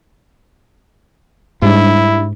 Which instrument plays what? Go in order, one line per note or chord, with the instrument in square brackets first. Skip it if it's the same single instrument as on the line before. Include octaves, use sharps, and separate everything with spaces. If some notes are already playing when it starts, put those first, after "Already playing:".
[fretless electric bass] G#2 [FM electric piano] G3 D4 [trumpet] E4